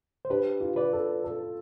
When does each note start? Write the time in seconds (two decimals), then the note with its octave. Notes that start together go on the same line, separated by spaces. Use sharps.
0.25 C5
0.30 D4 G4 B4
0.61 F4
0.76 B4 D5
0.93 A4
1.24 A4